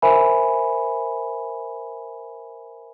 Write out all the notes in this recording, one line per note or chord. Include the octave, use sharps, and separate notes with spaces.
A#4 C5 E5 G#5 B5